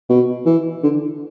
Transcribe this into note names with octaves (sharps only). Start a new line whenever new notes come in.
B2
E3
D3